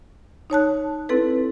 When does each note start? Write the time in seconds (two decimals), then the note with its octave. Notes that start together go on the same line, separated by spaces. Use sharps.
0.50 D#4 C#5 A5 F#6
1.09 C4 E4 A4 B4